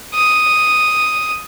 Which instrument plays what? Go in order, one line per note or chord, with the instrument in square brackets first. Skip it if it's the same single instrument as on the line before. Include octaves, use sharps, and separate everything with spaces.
[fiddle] D#6